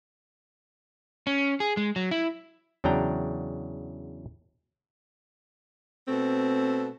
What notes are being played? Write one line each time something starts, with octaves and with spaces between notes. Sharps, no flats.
C#4
G#4
G#3
F#3
E4
E2 C#3 F#3 D4 G5 A#5
B2 A3 C4